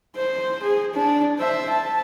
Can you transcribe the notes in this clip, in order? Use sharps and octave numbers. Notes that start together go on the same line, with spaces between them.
C5
G#4
D4
C5 E5
A5